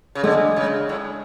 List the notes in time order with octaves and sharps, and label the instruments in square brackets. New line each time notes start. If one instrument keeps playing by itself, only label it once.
[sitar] C#3
[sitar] D3 [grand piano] G#3
[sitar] C#3
A2